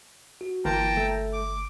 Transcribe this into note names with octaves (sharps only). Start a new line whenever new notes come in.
F#4
G1 E3 A#3 G5 A5 A#5 C6
A3
D6